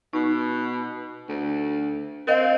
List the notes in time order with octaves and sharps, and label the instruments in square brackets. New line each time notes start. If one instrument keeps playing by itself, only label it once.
[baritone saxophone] B2 [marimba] D#4
[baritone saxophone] D2
[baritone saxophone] C4 [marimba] A#4 D#5 F5